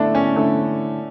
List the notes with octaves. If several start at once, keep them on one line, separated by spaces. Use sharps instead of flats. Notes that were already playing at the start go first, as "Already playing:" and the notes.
Already playing: D3 A3 D4 E4 A4
C#4
D3 A3 E4 A4